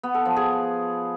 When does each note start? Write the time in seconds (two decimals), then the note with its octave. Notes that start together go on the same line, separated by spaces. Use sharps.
0.03 B3
0.14 A4
0.25 F3
0.36 G#4